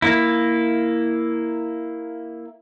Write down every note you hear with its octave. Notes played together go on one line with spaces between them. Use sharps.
A#3 E4